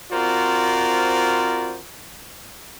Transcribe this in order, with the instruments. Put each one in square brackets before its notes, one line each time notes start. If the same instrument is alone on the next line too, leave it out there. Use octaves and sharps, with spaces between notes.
[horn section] C4 F4 F#4 A#4 C5 D5